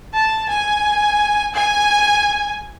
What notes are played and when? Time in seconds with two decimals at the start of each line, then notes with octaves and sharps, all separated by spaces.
0.13 A5
0.49 G#5
1.54 G#5